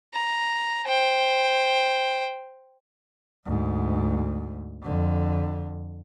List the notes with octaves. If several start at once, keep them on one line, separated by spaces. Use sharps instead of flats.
A#5
C5 G5
D2 G#2
F2 D3